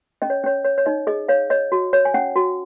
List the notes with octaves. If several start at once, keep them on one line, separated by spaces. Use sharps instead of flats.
C#4 D#5
C#5
C#4 C#5
C#5
C#5
D#4 D#5
G#4 D#5
C#5 F5
C#5 D#5
F#4
C#5
G#5
C#4 F#5
F#4